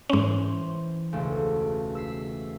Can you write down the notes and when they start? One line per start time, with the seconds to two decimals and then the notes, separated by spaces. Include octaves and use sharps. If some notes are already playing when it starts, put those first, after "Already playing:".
0.10 G#2 E3 C#4 C5 D#7
1.12 E1 C#2 A3
1.95 E6 B6 C7